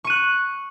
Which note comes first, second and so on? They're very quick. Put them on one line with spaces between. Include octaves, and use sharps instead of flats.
C#6 D#7 F#6